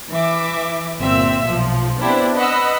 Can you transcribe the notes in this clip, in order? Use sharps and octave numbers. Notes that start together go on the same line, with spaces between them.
E3 E5 D6
G1 A#2 C4 E5 E6
B1 F3
B3 C4 D4 E4 G4 C5
B4 D#5 F#5 B5 E6